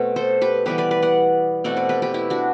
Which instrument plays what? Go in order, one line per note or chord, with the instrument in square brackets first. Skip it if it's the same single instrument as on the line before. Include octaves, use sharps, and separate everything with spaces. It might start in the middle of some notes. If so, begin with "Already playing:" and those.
Already playing: [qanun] B2 A3 C4
A4 C5
G4 B4
E3 G3 B3 G4 B4
B4 D5
B4 D5
D5 F#5
B2 A3 C4 D5 F#5
B4 D5
G4 B4
G4 B4
E4 G4
D4 F#4